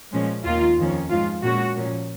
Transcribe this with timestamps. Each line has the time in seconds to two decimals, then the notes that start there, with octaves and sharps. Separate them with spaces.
0.12 A#2 F3 G#3 C#4
0.45 D#2 D#3 A#3 F4
0.77 F2 D#3 A#3 C#4
1.10 G#2 F3 G#3 F4
1.43 A#2 G#3 C#4 F#4
1.75 A#2 F3 A#3 C#4